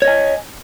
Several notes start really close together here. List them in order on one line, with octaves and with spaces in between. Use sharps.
C#5 D#5 G#5